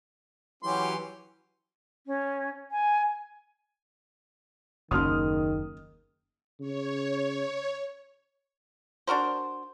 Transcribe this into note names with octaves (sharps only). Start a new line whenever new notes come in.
E3 F#3 C#4 G4 C6
C#4
G#5
F#1 D#2 D#3 A#3 C#4 C6 D#6 F6
C#3 C#5
D4 F#4 A#4 C5